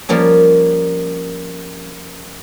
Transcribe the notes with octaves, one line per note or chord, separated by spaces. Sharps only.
F3 G3 A#3 C#4